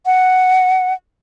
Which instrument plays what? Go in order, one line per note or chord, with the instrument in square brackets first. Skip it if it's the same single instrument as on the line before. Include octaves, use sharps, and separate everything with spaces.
[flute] F#5